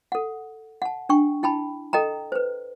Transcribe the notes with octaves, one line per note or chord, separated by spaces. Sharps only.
A4 F#5
F#5 A5
D4 G5 C#6
E4 G5 A5 B5
A4 D#5 G5 A#5
B4 C5